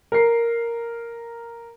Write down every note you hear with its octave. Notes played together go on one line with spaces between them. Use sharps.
A#4 C7